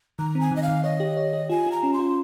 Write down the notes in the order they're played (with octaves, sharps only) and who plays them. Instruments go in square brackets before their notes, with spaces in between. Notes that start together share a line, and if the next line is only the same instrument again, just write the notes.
[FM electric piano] D#3 [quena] A#5
[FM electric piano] C4
[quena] G#5
[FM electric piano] D#3 [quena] D#5
[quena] F5
[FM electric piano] D#3
[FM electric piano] C#5 [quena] D#5
[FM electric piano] G4
C#5
G4
[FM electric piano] F4 [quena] G#5
[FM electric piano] F4
[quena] A#5
[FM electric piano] C#4
[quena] C6
[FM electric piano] F4